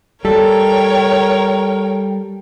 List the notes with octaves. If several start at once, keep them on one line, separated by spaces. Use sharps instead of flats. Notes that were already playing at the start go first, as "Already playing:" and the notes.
G3 A4 A#4 C#5 G5